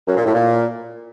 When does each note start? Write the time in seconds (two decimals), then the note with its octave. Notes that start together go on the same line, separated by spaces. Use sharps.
0.08 F#2
0.17 A#2
0.26 A2
0.34 A#2